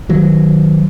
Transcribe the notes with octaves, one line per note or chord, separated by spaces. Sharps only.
D#3 F#3